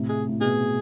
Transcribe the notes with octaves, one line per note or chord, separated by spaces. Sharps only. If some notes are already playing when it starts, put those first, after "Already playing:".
Already playing: A2 C3
G#4
A2
B2 G#4